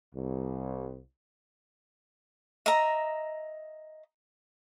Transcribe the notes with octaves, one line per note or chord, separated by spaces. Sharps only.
C2
D#5 E5 A#5